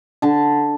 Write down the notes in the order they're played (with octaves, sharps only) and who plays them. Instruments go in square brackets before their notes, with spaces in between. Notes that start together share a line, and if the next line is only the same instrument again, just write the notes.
[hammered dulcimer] D3 A5